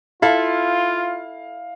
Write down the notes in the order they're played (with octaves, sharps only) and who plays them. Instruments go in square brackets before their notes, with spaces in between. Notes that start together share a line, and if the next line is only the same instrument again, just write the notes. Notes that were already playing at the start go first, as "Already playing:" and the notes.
[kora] E4 A4 [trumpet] F4 [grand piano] F5